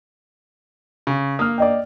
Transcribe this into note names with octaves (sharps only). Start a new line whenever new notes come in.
C#3
A#3 D#6 F6
D5 D#5 G5